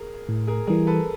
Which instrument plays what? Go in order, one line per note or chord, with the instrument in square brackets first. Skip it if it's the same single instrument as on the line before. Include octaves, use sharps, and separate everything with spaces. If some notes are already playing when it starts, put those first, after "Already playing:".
Already playing: [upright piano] G#4 A#4
[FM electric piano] A2
[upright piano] G#4 A#4
[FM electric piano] E3 G3 [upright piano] G#4 A#4
[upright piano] A4 B4